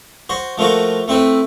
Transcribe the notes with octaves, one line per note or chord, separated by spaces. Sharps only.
F#4 C5
F3 A3 A#3 F4 F#4
A3 C4 E4 B4